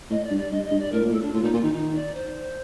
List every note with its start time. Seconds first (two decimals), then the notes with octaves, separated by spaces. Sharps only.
0.10 A2 D#5
0.24 D5
0.31 G2
0.37 D5
0.51 G2 D#5
0.65 D#5
0.71 G2
0.79 D5
0.92 A2 A#4
1.02 A#2
1.12 A2 A4
1.22 D4
1.33 A2 F4
1.43 A#2 D#4
1.53 A#2 F4
1.63 D#3 D#4
1.74 D#3 D#4
1.95 D5
2.14 C5